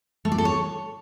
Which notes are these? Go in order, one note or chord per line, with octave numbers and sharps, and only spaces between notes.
A3
D5
A4
C#5